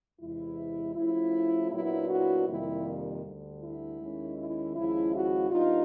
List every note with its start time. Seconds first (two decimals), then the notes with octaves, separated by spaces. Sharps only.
0.20 E2 C3 E3 G#3 E4
0.95 C#3 F3 A3 E4
1.71 A#2 F#3 B3 D4 E4
2.10 E4 F#4
2.48 F2 C3 D#3 G3 A#3 E4
3.24 D2 D3 G3
3.62 E4
4.00 D#2 D#3 G#3 C#4
4.38 E4
4.75 D#2 C#3 F3 G#3 E4
5.13 E4 F#4
5.51 A#2 G3 B3 D4 D#4 F4